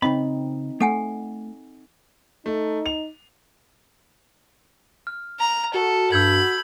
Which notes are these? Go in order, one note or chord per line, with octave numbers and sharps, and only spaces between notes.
C#3 C4 D#4 D#5 B5
A3 A4 F#5 G#5
A3 D#4
F7
F6
A#5
F#4 A4
G2 B5 E6 G6 G#6